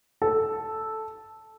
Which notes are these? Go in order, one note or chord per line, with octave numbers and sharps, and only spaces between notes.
A4